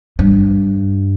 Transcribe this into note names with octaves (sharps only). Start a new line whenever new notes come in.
G2